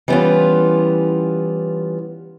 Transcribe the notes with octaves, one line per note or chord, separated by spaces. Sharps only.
E3 G3 B3 C#4 F4